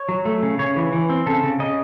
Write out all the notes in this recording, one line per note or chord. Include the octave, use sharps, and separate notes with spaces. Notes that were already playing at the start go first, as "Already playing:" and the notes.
Already playing: C#5
F#3
A3
C#3
C#3 C#5
E3
E3
C4
C#3 A4
C#3
C#3 D#5